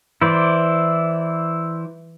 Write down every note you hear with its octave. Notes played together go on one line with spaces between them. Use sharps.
E3 E4 C5 D5